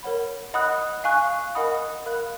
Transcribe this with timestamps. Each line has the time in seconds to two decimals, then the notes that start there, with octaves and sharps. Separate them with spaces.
0.03 A#4 C#5 F#5 B5
0.54 D#5 F#5 B5 D#6 F#6
1.04 F5 G#5 C#6 F#6
1.55 A#4 D#5 F#5 B5 D#6
2.06 A#4 F5 B5 F#6